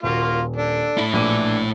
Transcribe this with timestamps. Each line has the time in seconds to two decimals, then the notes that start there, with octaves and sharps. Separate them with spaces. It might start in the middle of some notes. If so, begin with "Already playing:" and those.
0.03 D#1 A#3 F4 F#4
0.56 D4 A4
0.98 A2 E4
1.13 A#1 D3 E3 D5 D#7